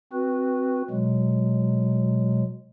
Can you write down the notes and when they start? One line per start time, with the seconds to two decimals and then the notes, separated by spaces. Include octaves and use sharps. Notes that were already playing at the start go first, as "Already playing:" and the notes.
0.13 C4 F#4 B4
0.90 B2 F#3 G#3